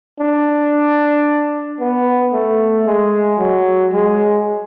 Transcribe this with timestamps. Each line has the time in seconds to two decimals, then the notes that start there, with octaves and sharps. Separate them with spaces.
0.20 D4
1.80 B3
2.33 A3
2.86 G#3
3.39 F#3
3.92 G#3